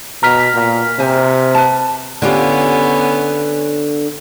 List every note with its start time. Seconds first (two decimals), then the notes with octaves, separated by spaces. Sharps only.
0.23 B2 A#5 F6 B6
0.55 A#2
0.99 C3 C5 G#5
1.55 B4 A5
2.22 D3 B3 C#4 F4 G4